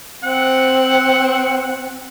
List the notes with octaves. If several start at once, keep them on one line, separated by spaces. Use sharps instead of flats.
C4 F#5